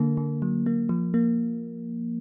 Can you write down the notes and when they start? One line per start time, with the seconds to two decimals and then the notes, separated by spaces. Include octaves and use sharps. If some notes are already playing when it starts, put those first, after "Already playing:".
Already playing: D3 A#3
0.17 D3
0.42 F#3
0.66 A#3
0.89 F3
1.14 A#3